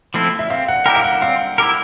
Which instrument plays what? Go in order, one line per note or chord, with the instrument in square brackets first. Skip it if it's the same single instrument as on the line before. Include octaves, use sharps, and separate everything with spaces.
[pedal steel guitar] F3 A3 C4 E4
[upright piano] E5
[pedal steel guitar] C4 [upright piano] F5
[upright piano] F#5
[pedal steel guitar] E4 G4 A#4 [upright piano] G5
[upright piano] F5
F#5
[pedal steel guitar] C4 [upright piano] F5
[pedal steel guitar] E4 G4 A#4